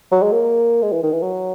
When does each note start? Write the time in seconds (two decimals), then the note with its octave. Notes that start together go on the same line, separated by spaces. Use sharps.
0.12 F#3
0.23 G#3
0.32 A#3
0.83 G#3
0.92 E3
1.03 D#3
1.12 E3
1.22 F#3